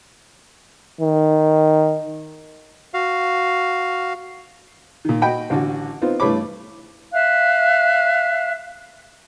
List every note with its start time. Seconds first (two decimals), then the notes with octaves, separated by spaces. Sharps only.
1.01 D#3
2.94 F#4 F5
5.05 A#2 D#3
5.22 F#4 D#5 G5 B5
5.50 A1 D3 F#4
6.02 B3 C4 D#4 F4
6.20 G2 E3 A3 C#5 B5 D6
7.14 E5 F5 F#6